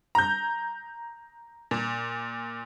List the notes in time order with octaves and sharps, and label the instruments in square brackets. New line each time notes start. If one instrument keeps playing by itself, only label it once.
[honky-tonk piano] A#5 G6
A#2